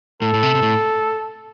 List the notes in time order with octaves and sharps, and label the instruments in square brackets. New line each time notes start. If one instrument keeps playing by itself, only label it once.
[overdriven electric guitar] A2 [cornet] A4
[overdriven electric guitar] A2
C3
C3
A2